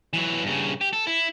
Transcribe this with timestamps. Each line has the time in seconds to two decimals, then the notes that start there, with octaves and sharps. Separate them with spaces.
0.13 E3 F#3
0.43 G2 C#3
0.81 G4
0.93 A4
1.07 E4